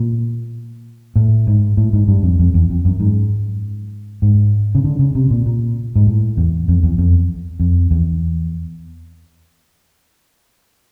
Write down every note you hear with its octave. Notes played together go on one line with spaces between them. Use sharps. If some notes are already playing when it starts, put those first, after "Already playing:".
Already playing: A#2
A2
G#2
A2
G#2
G2
F2
F2
E2
F2
F#2
G#2
G#2
C#3
D3
C#3
C3
A#2
A#2
G#2
A2
E2
F2
E2
F2
F2
E2